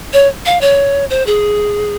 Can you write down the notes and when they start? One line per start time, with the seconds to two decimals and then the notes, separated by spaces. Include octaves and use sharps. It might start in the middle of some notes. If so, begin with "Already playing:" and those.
0.13 C#5
0.46 F5
0.61 C#5
1.10 C5
1.27 G#4